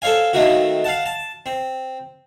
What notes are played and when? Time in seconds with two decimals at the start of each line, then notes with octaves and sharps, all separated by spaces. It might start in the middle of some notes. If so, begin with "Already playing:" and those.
0.02 A4 C5 C#5 F5 G#5
0.33 D#3 A3 A#3 C4 F#4
0.84 F5 F#5 A5
1.06 A5
1.46 C4